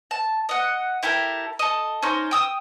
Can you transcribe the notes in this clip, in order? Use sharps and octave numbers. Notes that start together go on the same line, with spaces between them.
A5
D#5 F#5
E4 G4 A4 A#4
A4 D#5
C#4 D#4 C5
G5 D#6 E6